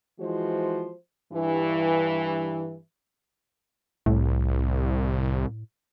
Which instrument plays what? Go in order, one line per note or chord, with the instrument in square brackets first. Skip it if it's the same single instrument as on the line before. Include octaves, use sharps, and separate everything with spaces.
[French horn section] E3 F3 G#3 F#4 C5
G2 E3
[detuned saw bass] C2 [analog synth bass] A2